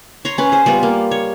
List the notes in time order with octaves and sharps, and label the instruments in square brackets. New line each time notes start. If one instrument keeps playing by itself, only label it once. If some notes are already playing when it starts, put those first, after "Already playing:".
[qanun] C#5 A#5 C6
C#4 B4
G#4 C5
G3 B3 F4
A#3
C#5